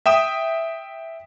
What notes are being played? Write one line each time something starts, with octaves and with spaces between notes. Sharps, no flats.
E5 G5 D#6 E7